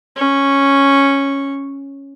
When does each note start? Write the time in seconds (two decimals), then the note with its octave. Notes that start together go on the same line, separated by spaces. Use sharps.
0.16 C#4 C#6